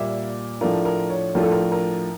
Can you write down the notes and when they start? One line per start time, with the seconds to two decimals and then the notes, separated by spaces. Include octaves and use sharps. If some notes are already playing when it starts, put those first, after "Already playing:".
Already playing: A#2 G3 A#3 E5
0.61 A2 F3 A3 D4 F4 A#4
0.85 A#4
1.10 C#5
1.35 A2 F3 A3 D4 F4 A#4
1.43 A4
1.52 A#4
1.72 A#4